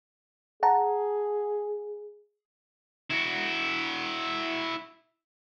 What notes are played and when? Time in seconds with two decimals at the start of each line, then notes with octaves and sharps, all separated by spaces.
0.63 G#4 F#5 A5 A#5
3.10 E4 F#4